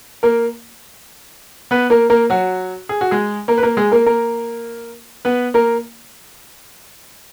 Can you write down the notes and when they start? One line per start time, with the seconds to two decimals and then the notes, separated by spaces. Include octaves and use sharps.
0.23 A#3 A#4
1.71 B3 B4
1.90 A#3 A#4
2.10 A#3 A#4
2.30 F#3 F#4
2.89 G#4
3.01 F#4
3.11 G#3 G#4
3.48 A#3 A#4
3.58 B4
3.63 A#3 A#4
3.77 G#3 G#4
3.92 A#3 A#4
4.06 A#3 A#4
5.25 B3 B4
5.54 A#3 A#4